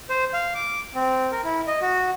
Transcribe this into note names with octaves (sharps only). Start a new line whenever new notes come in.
C5
F5
D6
C4
A#4
E4
D#5
F#4